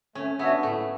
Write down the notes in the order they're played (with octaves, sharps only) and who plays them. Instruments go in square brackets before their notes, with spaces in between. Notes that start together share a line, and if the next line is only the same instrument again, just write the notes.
[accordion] A3 [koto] C#4
[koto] B3 [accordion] D4 F#4 C#5 E5
[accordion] A2 [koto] A3